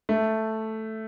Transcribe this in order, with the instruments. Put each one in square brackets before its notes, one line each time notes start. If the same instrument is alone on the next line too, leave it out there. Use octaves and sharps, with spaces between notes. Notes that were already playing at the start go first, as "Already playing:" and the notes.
[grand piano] A3